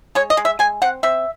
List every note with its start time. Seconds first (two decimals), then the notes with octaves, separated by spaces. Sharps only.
0.15 G#3 C#5
0.30 D#5
0.37 G#3
0.45 E5
0.59 G#3 G#5
0.82 C4 F#5
1.03 C4 E5